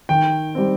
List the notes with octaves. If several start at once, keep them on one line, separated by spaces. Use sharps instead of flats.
D#3 G5
G3 C4